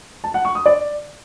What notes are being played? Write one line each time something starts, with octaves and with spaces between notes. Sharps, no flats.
A5
F#5
C#6
D#6
D5